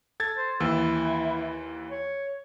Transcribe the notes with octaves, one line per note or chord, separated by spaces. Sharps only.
A4 G#6 A6
C5
D#2 E3 E4 E6
C#5